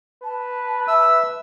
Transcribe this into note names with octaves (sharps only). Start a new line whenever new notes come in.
B4 A5
E5 E6